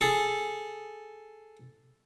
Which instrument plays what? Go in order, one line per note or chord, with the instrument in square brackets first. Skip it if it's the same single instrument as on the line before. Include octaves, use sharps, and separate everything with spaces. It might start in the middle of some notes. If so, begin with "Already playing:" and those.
[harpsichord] G#4 A4